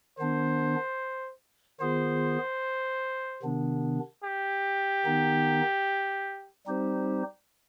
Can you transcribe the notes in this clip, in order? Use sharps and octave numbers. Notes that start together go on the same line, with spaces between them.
D#3 B3 D4 C5
D#3 B3 F4 G#4 C5
C3 D#3 B3 D4
G4
D#3 B3 D#4
G3 C4 D#4 G4 C5